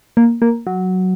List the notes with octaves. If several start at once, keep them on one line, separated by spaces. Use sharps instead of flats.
A#3
A#3
F#3